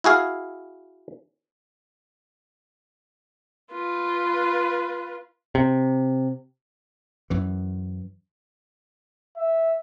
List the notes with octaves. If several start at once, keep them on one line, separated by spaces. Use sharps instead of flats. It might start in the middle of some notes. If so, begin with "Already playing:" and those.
E4 F#4 G#4 F5
F4 B4
C3
F#2 E3
E5